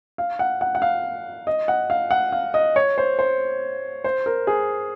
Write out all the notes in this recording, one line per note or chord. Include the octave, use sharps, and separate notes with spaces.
F5
F#5
F#5
F#5
F5
D#5
F#5
F5
F#5
F5
D#5
C#5
C5
C5
C5
A#4
G#4